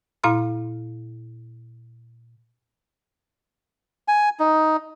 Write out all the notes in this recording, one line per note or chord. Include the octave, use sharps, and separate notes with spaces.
A#2 E4 F5 C6 F6
G#5
D#4